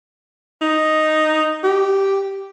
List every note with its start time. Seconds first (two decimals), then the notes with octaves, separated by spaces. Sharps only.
0.61 D#4
1.63 G4